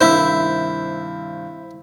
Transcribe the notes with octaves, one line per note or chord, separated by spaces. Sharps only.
G2 C3 D#3 E4 C5 E5 E6